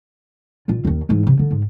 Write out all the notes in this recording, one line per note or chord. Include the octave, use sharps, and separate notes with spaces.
A#2 F4
D#2 D#3
G#2 E3
C3
D3
G#2